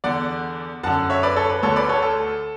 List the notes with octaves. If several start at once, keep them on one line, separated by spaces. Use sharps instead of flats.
E2 D3 D5 F#5
F#2 D3 F#5 A5
C#5 E5
B4 D5
A4 C#5
B4
D2 D3 A4 C#5
B4 D5
A4 C#5
A4